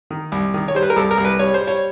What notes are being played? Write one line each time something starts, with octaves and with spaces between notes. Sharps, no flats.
D#3
C2
D#3
C#5
G3 C5
B4
A#4
C2 A4
A#4
C2
B4
G3 C#5
C5
G3
C#5